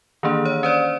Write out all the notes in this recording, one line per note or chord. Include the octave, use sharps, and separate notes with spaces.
D#3 E3 A#3 D4
C#5
C#4 C5 D5